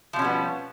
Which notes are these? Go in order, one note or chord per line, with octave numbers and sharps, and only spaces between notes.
B2 F3 G3 B3 C#4